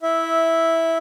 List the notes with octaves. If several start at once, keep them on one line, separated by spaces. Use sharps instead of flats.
E4 E5